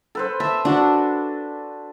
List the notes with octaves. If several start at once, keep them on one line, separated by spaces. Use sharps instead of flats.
A4 B4 C5
E5 A5
D4 F#4